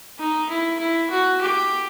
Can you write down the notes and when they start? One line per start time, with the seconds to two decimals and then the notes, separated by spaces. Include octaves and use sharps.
0.19 D#4
0.49 E4
0.79 E4
1.10 F#4
1.41 G4